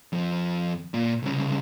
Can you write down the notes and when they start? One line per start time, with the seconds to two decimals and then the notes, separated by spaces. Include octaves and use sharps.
0.13 F2 F3
0.94 A#2
1.23 C2 C#3